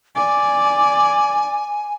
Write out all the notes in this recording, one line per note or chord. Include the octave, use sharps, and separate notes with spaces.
D5 G#5